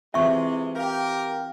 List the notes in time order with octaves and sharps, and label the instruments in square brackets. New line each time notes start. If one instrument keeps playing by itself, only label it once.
[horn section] C3 G#3 [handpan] E3 C4 F4 [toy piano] E5 C#6
[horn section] G4 A#4 [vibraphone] F5 G5